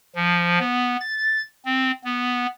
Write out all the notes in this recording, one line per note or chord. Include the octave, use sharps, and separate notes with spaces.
F3
B3
A6
C4
B3